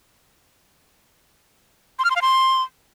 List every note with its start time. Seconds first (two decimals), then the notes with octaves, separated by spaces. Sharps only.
1.99 C6
2.05 F6
2.10 C6
2.16 F5
2.22 C6